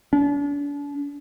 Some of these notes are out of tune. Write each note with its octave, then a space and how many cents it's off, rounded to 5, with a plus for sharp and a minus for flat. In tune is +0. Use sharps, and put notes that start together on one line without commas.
D4 -40